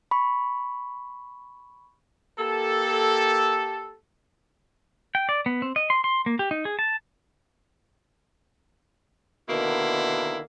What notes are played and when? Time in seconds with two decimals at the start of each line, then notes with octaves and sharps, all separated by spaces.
0.11 B5 C#6
2.39 A#3 G4 A4
5.15 G5
5.29 D5
5.46 B3
5.62 C4
5.76 D#5
5.90 C6
6.04 C6
6.26 A#3
6.39 G4
6.51 D#4
6.65 G#4
6.79 A5
9.49 B2 D3 D#3 A#3 E4